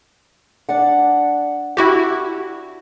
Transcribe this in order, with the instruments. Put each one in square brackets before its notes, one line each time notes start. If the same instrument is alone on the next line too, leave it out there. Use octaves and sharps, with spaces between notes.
[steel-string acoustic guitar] D4 D5 F#5
[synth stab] E4 F#4 G4